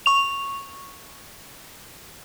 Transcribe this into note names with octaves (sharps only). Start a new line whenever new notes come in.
C#6 F7